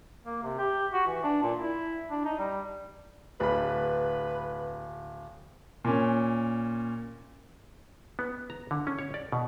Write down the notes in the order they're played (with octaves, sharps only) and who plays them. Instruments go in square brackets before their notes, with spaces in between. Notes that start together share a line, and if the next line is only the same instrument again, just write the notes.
[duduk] A#3
C3
G4
F#4
E3
D4
A#2
E4
D4
D#4
G3
[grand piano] D1 B5 [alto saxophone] B4
[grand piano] A#2 C#4
[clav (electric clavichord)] B3
A#5
D3
C#4
C#5
D5
B2